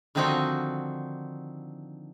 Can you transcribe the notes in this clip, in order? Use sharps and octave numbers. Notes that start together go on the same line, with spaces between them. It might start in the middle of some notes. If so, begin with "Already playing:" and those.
D3 D#3 F3 C4 D#4 F#4